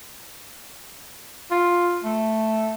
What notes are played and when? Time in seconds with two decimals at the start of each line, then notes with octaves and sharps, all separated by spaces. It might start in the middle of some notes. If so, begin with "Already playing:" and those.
1.51 F4
2.04 A3